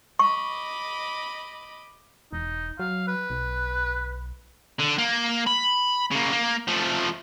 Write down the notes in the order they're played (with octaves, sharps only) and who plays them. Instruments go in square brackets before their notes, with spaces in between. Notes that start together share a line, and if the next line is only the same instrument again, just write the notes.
[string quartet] D#5 B5 D6 [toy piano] C#6
[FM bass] E1 [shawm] D#4
[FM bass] F#3 [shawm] F5
[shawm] B4
[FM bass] B1
[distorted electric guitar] D3
A#3
B5
C#3 A#3
A#3
F3 A3